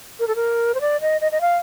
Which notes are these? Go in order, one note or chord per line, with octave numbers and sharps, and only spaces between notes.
A#4
A4
A#4
C5
D5
D#5
D#5
D#5
F5